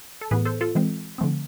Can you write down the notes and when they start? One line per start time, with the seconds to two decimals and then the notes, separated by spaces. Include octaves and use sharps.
0.21 A4
0.31 A2 E3 B3 G#4 B4
0.45 A4 C5
0.61 F4 A4
0.75 E3 G#3 C4
1.18 D3 F3 A3 C4